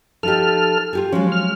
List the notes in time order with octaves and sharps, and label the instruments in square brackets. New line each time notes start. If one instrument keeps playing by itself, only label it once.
[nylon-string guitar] F3 D#4 G4 [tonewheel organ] A4 F6
[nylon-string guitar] F4 G4 G#4
[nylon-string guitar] F3 F#3 G#3 [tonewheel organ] C#4
[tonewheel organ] F6